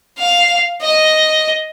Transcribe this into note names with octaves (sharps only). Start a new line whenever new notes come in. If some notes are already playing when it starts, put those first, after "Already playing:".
F5
D#5